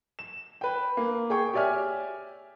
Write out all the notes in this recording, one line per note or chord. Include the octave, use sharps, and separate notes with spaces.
E7
B4 G5
A#3
G#4 G5 C#6
G4 C#5 D5 E5 G#5 F6